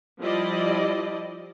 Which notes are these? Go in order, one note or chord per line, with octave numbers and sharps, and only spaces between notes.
F3 G3 E4 D5 D#5